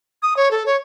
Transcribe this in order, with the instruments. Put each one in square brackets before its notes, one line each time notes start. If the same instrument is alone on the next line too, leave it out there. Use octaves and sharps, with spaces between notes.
[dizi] D#6
C#5
A4
C#5